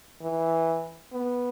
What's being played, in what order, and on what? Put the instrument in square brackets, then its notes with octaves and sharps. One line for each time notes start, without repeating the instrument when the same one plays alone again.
[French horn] E3
B3